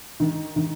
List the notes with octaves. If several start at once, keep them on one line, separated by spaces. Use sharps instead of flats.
D#3
D#3